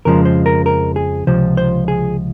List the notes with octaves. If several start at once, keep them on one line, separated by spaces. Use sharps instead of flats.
F2 C#3 F3 G#3 A#4
C5
A#4
A#4
G#4
C#2 C3 F3 C5
C5
G#4